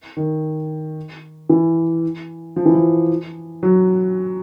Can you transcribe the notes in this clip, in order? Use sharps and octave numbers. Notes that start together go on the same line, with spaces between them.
D#3
E3
F3
E3
F3
F#3